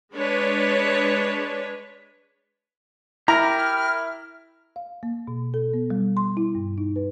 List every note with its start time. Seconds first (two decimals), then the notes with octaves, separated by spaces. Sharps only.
0.14 G#3 D4 B4 C#5
3.28 E4 G4 A#4 A#5 F6
4.76 F5
5.03 A#3
5.27 B2
5.54 A4
5.74 B3
5.90 G3
6.17 C6
6.37 E4
6.55 G2
6.78 D#4
6.96 B4